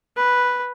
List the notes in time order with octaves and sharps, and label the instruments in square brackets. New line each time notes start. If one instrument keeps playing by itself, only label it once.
[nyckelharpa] B4